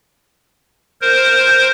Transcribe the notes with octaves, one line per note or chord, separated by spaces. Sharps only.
A#4 C5